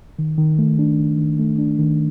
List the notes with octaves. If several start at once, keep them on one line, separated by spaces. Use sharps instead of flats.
D#3
D#3
A3
D4
D#3
D#3
A3
D4
D#3